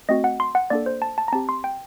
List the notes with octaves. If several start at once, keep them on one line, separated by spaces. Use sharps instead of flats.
A3 C4 F#4 D#5
F#5
C6
F#5
A#3 D4 A4 D5
C5
A5
A5
A#5
C4 G4 A5
C6
G5